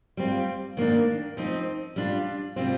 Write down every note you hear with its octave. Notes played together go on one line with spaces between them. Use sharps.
G3 C4 F4
D#3 A#3 D4
F3 C4 D#4
G3 D4 F4
C3 G3 C4 F4